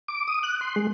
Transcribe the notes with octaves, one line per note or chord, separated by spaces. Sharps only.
D6
D#6
F#6
C6
G#3